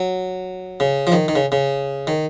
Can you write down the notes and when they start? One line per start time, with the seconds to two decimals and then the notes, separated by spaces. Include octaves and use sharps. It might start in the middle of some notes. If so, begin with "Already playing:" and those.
Already playing: F#3
0.80 C#3
1.07 F3
1.12 D#3
1.28 D#3
1.36 C#3
1.52 C#3
2.07 D#3